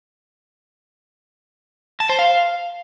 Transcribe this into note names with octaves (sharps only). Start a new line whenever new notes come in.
A5
C5
F5